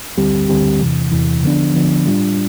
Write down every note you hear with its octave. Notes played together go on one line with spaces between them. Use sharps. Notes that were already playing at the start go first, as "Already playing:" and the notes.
D2 D3 G3 C4 G4
D2 D3 G3 C4 G4
E2 C3 E3
E2 C3 E3
D3 F3 B3 D4
D3 F3 B3 D4
A2 G3 D4 F4